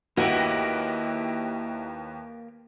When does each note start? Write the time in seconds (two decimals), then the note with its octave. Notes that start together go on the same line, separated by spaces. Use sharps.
0.17 D#2 A#3 E4 F#4 G4 B4 D#5 A#6